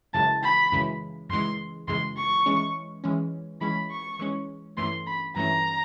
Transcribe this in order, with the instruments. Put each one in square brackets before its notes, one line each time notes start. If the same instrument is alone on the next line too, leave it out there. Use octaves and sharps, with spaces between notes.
[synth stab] F#2 C#3 E3 G#3 [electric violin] A5
[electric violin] B5
[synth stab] F#2 C#3 E3 G#3
[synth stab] F#2 C#3 E3 G#3 [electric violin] C6
[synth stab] F#2 C#3 E3 G#3 [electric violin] C6
[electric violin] C#6
[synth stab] E3 G#3 C#4
E3 G#3 C#4
[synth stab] E3 G#3 C#4 [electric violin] B5
[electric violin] C#6
[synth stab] E3 G#3 C#4
[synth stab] G2 E3 A3 C#4 [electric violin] C6
[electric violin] B5
[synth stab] G2 E3 A3 C#4 [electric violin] A#5